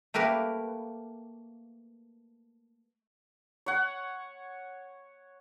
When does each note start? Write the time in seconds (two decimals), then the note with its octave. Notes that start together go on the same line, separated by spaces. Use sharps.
0.14 A3 A#3 G4 A#4 B4
3.66 C#5 F#5